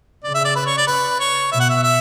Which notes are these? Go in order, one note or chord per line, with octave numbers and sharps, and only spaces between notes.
C#3 D5
E5
D5
B4
C#5
D5
B4
C#5
B2 E5
F#5
E5
E5